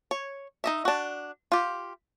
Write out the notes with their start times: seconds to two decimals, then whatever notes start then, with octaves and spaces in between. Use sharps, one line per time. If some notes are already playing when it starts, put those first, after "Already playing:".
0.11 C#5
0.64 D#4 D#5 E5
0.85 D4 F#4
1.52 F4 G4